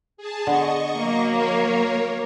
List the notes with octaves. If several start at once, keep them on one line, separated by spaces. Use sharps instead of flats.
G#4 A5
D3 B3 D#5 C#6
F#3 A#3
A#4 C#5